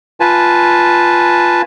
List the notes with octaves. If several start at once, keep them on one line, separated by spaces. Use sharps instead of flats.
F4 B4 G#5 A5